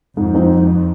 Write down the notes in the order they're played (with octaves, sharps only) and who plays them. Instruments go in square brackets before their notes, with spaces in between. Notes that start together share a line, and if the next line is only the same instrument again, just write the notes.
[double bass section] F2 [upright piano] G#2
[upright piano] F3 C4 D#4